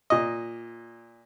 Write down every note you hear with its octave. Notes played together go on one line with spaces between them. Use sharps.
A#2 D#5